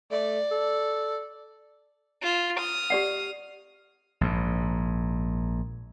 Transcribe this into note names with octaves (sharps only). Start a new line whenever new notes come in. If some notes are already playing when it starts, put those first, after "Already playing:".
A3 D5
A4
F4
D#6 F6
G4 D5 F#5
A#1 G#2